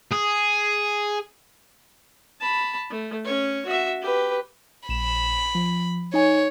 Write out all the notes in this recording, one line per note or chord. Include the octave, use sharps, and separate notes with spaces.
G#4
A5 B5
A3
C#4 C#5
F#4 E5
G4 B4
A#1 B5 E7
F3
D#4 C#5 G#5